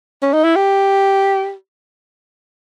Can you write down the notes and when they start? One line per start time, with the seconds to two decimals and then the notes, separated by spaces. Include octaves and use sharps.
0.22 C#4
0.33 D#4
0.44 E4
0.56 G4